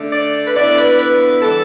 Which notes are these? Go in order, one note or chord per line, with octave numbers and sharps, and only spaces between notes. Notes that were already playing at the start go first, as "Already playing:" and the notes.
Already playing: D3 A3 D4
D5
B4
D3 B3 E4 D5
B4
B4
B4
E3 G3 D4 A4